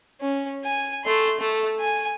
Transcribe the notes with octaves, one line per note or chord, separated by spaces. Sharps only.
C#4
G#5
A3 C6
A3
G#5